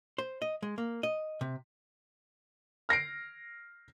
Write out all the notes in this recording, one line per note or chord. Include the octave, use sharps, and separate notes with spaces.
C5
D#5
G#3
A#3
D#5
C3
F6 A#6 C7 D7